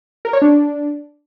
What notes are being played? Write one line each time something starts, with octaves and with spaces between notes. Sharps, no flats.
A#4
C#5
D4